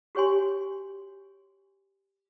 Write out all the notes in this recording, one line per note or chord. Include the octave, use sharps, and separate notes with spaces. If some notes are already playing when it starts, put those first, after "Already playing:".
F#4 G4 C#5 G#5 C6